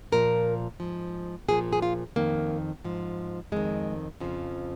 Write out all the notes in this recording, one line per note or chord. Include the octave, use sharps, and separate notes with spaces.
A#2 F3 A#4
G#2 F3
A#2 F3 G#4
G#4
F4
F2 D#3 A#3
G#2 F3
F2 D#3 G#3
F2 C#3 F3